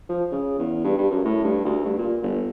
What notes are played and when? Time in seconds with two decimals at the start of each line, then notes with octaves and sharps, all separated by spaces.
0.09 F3
0.32 C#3
0.59 E2
0.84 G2
0.98 G2
1.11 F#2
1.25 A2
1.44 G2
1.65 D2
1.85 G2
1.98 A#2
2.23 G1